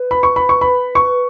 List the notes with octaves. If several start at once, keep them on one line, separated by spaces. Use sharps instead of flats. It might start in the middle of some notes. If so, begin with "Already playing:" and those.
Already playing: B4
B5
C#6
B5
C#6
B5
C#6